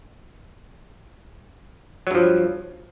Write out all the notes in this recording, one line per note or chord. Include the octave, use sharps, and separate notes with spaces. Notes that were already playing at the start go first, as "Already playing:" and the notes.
G2 F3 F#3